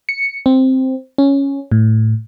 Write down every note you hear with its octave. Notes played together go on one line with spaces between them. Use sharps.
C#7
C4
C#4
A2